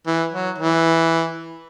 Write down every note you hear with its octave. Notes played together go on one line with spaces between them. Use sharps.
E3
F#3
E3